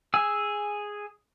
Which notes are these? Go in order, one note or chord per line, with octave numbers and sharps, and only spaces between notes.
G#4 G#5 E6